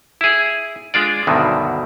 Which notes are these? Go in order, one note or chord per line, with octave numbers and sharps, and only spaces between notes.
E4 G#4
G#3 D4 F4 D5
D2 G2 B2 D3 D#3 F#3